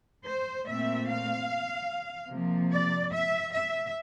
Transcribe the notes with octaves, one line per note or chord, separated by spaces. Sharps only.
C5
A#2 A3 C4 E5
F5
C3 F3 A#3
D5
E5
E5